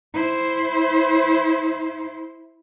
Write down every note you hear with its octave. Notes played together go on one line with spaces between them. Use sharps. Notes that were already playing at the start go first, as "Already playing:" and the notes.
E4 C5